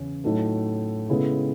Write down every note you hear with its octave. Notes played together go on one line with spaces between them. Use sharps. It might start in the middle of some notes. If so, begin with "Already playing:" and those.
Already playing: E2 C#3 C#4
A2 F#3 A3 D#4
C#3 G#3 B3 E4 A4